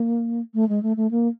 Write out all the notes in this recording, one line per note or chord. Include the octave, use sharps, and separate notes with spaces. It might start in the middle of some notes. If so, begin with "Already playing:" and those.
Already playing: A#3
A3
G#3
A3
A3
A#3